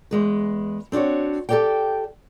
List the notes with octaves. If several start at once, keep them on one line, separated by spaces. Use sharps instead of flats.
E2 G#3 B4
C4 D4 F4 F#4 C#5
G4 A4 A#4 C#5 D5 G5